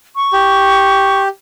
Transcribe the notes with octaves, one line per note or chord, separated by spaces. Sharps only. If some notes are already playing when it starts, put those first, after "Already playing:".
C#6
G4